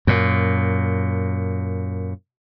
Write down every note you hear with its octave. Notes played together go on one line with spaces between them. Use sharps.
F#2 A#2